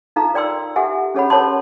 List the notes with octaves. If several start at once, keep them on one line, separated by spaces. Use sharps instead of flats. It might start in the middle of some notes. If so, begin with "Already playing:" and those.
D#4 F4 A4 F5 A#5
A#4 D5 G5 C6 E6
G4 A4 E5 F#5 G#5
C#4 G#4 A4 C#5 F#5 B5
A4 A#4 C#5 F#5 A5 C6